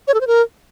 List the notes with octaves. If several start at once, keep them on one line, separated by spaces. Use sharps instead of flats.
C#5
A4
C5
A#4